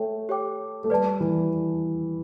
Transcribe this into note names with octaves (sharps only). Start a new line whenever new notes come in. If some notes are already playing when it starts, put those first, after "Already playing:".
Already playing: A3 A4 C#5 E5 G5
G4 C#5 G5 D6
A3
G3 B4 D5 A5
E3